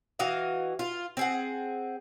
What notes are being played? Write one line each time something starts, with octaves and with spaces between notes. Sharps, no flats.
E3 F#4 D#5 F5
F4
C4 G#4 F#5